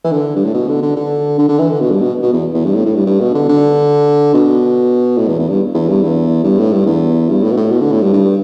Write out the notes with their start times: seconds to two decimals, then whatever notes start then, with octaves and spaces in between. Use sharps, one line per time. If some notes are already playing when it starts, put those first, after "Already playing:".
0.05 E3
0.12 D3
0.36 G2
0.45 A2
0.54 B2
0.69 D3
0.82 D3
0.96 D3
1.38 D3
1.49 D3
1.59 E3
1.70 D3
1.80 B2
1.91 G2
2.02 B2
2.23 B2
2.33 E2
2.54 E2
2.65 G2
2.75 A2
2.86 A2
2.96 G2
3.06 G2
3.21 B2
3.35 D3
3.49 D3
4.34 B2
5.18 A2
5.28 E2
5.39 E2
5.50 G2
5.74 E2
5.88 G2
6.02 E2
6.44 G2
6.59 A2
6.73 G2
6.86 E2
7.29 G2
7.43 A2
7.52 B2
7.57 A2
7.71 B2
7.81 D3
7.92 A2
8.03 G2
8.13 G2